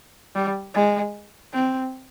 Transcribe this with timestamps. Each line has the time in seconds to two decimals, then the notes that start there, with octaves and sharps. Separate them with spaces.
0.35 G3
0.74 G#3
1.53 C4